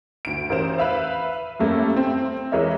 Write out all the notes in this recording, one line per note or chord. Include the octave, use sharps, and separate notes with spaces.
D2 D7
A1 A#4 C5 E7
B4 E5 F5
F#2 G3 A3 A#3
C4
E3 G#3 A#4 C#5 D#5 E5